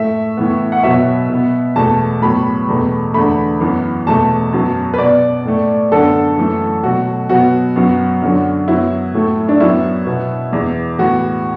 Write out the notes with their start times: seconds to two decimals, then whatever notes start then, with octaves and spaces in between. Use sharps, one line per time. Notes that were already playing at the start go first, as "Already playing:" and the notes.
Already playing: A2 A3 E5
0.37 A2 E3 B3
0.72 F#5
0.83 B2 F#3 B3 E5
1.30 B2 B3
1.76 E2 B2 A3 A5
2.22 A2 F#3 B3 B5
2.68 E2 B2 A3
3.14 E2 D3 A3 B5
3.60 F#2 E3 B3
4.06 E2 B2 A3 A5
4.53 F#2 F#3 B3
4.94 B4
4.98 B2 B3 D5
5.45 A2 A3
5.92 F#2 D3 B3 A4
6.37 F#2 E3 A3
6.83 B2 F#3 A3 F#4
7.29 B2 F#3 B3 F#4
7.76 F#2 F#3 B3
8.22 F#2 D3 F#3
8.68 F#2 F#3 B3 E4
9.14 A2 F#3 A3
9.49 D4
9.60 F#2 F#3 B3 E4
10.07 B2 B3
10.53 E2 E3 B3
10.98 A2 E3 B3 F#4